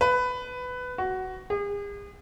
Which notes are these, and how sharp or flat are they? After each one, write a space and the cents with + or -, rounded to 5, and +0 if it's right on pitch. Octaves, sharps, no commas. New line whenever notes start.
B4 +15
F#4 +15
G#4 -40